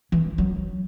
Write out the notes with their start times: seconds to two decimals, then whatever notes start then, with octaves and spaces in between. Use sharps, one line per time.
0.12 E3
0.38 F#3